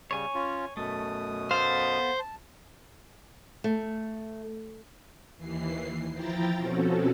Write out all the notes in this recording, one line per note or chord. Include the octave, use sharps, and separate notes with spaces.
C#3 G3 C#5 G#5
C#4 F4
F#2 B2 A3 D#6
B3 A4 C5 F5
A5
A3
D#2 E3 C7
F3 E4 G5 A#5 A6
B2 F3 C4 C#4 F#4 A4